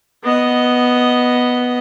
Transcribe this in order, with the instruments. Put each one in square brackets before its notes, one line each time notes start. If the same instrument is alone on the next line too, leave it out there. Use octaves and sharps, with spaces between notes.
[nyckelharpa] B3 D#5